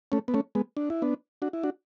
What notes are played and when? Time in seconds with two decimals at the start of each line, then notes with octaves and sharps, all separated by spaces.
0.12 A3 C#4
0.28 B3
0.34 A3 C#4
0.55 G#3 B3
0.77 D4
0.90 E4
1.02 B3 D4
1.42 D4 F#4
1.53 E4
1.63 D4 F#4